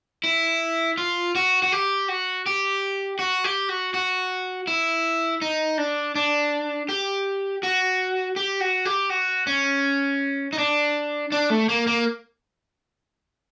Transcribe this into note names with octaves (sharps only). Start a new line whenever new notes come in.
E4
F4
F#4
F#4
G4
F#4
G4
F#4
G4
F#4
F#4
E4
D#4
D4
D4
G4
F#4
G4
F#4
G4
F#4
C#4
D#4
D4
D4
A3
A#3
A#3